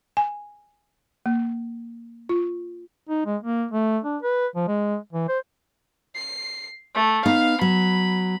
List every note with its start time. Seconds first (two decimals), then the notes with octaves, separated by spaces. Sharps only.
0.17 G#5
1.26 A#3
2.29 F4
3.09 D#4
3.26 G#3
3.43 A#3
3.71 A3
4.04 D4
4.23 B4
4.55 F3
4.68 G#3
5.13 E3
5.28 C5
6.16 C7
6.95 A3
7.26 B3 D#4 F5
7.61 F#3 B5